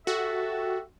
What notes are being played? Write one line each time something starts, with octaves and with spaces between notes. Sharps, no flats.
F#4 G4 A4 E5